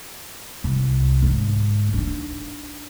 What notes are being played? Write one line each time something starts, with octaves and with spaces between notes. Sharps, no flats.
C2
G#2 D3
D4 D#4